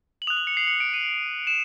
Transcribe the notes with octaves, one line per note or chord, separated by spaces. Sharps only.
F#7
D#6 F#6 F7
F#7
C#7
C7
C#7
D7
D#7
E7